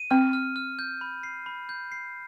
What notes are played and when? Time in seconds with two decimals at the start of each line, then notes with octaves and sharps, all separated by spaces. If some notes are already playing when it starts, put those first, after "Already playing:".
Already playing: D#7
0.11 C4 F6
0.33 F6
0.56 F6
0.79 G6
1.01 B5
1.23 C7
1.46 B5
1.69 G6
1.92 C7